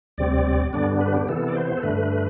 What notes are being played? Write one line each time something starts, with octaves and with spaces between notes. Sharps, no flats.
D2 C3 G3 C4 D5
G2 D3 G3 B3 D4 D5
B4
G4
C3 E3 B3 A4
D5
C5
A4
G2 D3 A3 B4